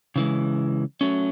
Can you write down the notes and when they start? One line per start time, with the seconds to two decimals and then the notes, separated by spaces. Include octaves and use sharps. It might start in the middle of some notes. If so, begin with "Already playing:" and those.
0.16 C#3 E3 G#3
1.01 F#3 A3 C#4